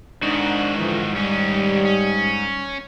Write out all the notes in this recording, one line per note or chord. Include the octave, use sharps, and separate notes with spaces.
G#2 D#3 D4 D#4 F#4
D3 E3 F3
D#2 G3 C#4
C#4